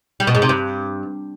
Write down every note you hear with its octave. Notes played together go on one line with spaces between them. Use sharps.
G3
B2
G#2
C3
G2